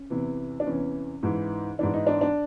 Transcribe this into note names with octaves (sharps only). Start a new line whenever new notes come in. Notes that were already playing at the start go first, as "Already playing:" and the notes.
Already playing: C#4
E2 C3 E3
D4
E2 C3 E3 C#4
G#2 E3
G#2 E3 D4
D#4
D4
D4